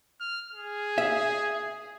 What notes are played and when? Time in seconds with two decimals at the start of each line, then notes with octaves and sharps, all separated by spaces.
0.21 F6
0.53 G#4
0.98 E5